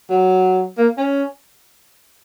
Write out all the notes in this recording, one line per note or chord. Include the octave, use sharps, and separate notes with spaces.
F#3
A#3
C#4